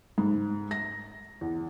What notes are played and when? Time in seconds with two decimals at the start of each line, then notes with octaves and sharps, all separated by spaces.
0.18 G#2
0.71 A#6
1.41 E2